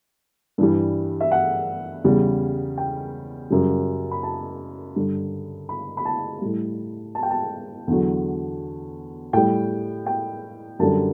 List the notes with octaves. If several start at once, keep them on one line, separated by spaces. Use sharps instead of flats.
G2 E3 G3
E5
F#5
E2 C#3 G3
G5
F#2 C#3 G3
B5
A5
G2 D3 G3
B5
B5
A5
A2 G3
A5
G5
A5
E2 D3 F#3
A2 G3 G5
G5
F#2 D3 G3 A5